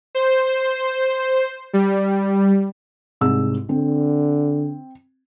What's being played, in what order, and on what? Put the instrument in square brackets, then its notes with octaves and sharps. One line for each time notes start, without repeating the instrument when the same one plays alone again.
[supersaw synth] C5
G3
[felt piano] C2 G#2 E6
[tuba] D3 [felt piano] C4